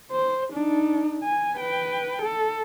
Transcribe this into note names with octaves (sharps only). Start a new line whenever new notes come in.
C5
D4 D#4
G#5
B4 G5
A4